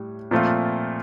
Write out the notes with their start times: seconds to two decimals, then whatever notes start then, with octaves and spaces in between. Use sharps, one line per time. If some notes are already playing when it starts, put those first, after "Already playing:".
Already playing: A2 G3
0.31 A#2 F3 A3 C4 F4